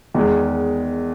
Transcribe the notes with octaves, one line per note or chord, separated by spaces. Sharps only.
E2 D#3 G#3